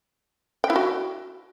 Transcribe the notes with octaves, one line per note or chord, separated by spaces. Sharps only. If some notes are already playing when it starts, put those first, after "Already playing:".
G5
E4
F#4